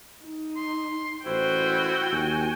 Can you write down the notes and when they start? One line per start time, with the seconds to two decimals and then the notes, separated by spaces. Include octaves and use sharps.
0.24 D#4
0.56 C6
1.26 A1 E4 F#4 C5 G5
2.12 D#2 G#5